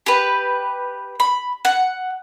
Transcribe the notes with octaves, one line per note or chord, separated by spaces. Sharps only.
G4 B4
B5
F#5